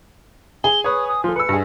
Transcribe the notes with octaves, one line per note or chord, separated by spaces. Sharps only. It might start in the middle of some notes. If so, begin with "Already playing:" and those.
G#4 G7
B4 C#5 D#6
D#6
F3 A4 C6
B4 E6 C#7
G2 G#4